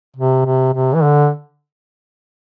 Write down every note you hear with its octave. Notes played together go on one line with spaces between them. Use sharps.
C3
C3
C3
E3
D3